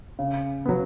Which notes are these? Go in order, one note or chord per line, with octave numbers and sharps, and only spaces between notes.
C#3
F#3 B3